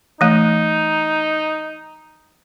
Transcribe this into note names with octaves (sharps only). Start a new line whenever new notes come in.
E3 A3 D#4